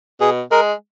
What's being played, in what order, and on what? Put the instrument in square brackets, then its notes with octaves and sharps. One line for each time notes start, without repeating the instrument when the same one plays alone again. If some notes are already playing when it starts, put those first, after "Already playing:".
[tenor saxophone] B2 [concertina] G#4
[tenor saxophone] G#3 [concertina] A#4